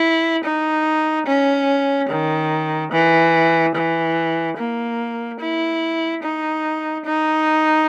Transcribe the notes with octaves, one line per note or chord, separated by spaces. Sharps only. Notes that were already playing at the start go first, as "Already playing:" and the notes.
Already playing: E4
D#4
C#4
D#3
E3
E3
A#3
E4
D#4
D#4